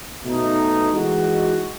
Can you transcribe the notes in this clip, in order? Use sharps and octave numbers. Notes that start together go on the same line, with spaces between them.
B2 A3 D#4
E3 G#3 D#4 F#4